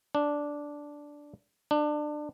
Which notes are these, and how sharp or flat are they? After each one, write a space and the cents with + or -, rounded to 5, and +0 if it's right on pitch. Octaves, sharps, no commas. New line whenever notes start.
D4 -5
D4 +25